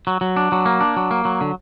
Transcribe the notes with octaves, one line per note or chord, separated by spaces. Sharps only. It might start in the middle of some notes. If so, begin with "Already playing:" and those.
F#3
F#3
D4
F#3
A#3
D4
F#3
A#3
F#3
D3